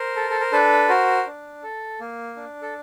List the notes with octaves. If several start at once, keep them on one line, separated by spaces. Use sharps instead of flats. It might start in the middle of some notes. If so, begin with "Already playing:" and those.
Already playing: A#4 C5
A4
A4
A#4
D4 A4 B4
F#4 A#4 C5
D4
A4
A#3
D4
A4